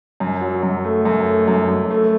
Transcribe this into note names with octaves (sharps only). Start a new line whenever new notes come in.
F#2
F#3
F#2
A3
F#2
A3
F#2
F#2
A3